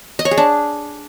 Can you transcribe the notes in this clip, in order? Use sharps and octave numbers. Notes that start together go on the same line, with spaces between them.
D#5
C#5
G#4
D4